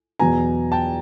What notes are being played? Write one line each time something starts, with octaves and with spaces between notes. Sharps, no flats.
E2 B2 F#3 B3 G#5 A#5
G5 A5